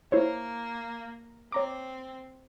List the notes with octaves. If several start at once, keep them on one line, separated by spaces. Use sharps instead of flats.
A#3 E4 C5 C#5
C4 C#5 A#5 D6